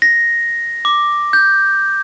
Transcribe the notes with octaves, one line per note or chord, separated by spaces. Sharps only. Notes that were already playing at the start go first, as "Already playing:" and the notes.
A#6
D6
G6